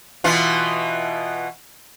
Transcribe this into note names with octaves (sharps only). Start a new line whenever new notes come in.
B2 E3 F4